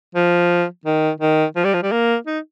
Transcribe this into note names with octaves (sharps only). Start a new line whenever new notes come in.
F3
D#3
D#3
F3
G3
F3
G3
A#3
D#4